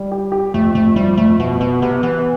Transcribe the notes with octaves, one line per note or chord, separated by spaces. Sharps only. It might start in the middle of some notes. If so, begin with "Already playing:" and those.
Already playing: G3
G4
G4
F2 A3
F2 A3
F3 G3
F2 A3
B2 B3
B2 B3
C3 B3
E3 B3